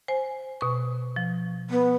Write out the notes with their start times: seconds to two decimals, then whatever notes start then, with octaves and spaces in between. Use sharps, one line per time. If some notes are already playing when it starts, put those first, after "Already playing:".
0.08 C5 G#5
0.61 B2 C#6
1.16 F3
1.70 B3